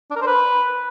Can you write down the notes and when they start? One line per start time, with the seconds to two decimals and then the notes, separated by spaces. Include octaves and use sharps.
0.11 D4
0.16 A#4
0.21 C5
0.26 B4